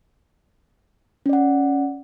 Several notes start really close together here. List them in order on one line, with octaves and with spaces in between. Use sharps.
C#4 D5 F#5